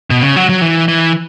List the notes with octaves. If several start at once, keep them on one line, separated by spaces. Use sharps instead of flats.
B2
C#3
F#3
F#3
E3
E3